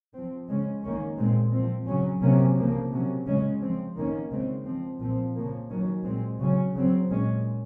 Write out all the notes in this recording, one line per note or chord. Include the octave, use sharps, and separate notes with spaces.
F3 C4
C#3 G#3 C#4
D#3 A#3 C#4
A#2 G#3 C4
F3 C4
C#3 F#3 C#4
C3 F#3 A#3 C#4
C#3 F3 A#3
C3 F#3 C#4
C#3 G#3 C#4
F3 C4
D#3 A#3 C#4
C#3 G#3 C4
F3 C4
A#2 F3 C4
C#3 F3 A#3
D#3 F#3 C#4
A#2 G#3 C4
C#3 F#3 C#4
C#3 F#3 C4
A#2 G#3 C#4